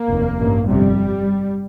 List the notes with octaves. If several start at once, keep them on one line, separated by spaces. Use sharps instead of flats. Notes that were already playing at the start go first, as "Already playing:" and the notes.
Already playing: A#3
F1 D#2
A1 G2
G1 F2 C3 G3